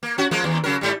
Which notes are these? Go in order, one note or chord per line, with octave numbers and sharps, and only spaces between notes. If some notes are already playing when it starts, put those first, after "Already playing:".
A#3
C#4 F#4
F3 G#3 A#3
D#2
C#3 F#3 A#4
G#2 G3